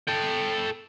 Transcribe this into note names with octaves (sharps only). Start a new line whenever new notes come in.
A4 G5